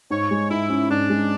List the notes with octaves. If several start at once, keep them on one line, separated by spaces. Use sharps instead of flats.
G#2 C#5
G#3
G#2 E4
C#4
G#2 D4
G#3